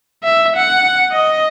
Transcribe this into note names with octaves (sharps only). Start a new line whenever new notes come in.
E5
F#5
D#5